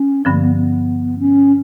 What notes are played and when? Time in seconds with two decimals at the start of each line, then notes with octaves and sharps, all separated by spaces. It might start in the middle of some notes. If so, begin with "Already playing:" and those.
Already playing: C#4
0.25 G2 D3 F3 C4
0.33 A#3
0.41 B3
0.56 B3
1.19 C#4